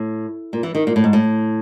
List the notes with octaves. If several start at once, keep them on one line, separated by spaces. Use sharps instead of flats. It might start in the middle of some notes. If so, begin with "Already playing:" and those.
Already playing: A2
A#2
E3
D#3
A#2
A2
G#2
A2